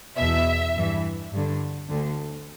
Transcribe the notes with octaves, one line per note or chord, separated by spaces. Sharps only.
E2 B2 E5
G2 E3
G2 D3
D2 D3